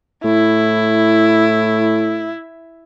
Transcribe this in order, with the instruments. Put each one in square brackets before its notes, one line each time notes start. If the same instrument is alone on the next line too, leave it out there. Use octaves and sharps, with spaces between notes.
[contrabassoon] A2 [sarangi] E4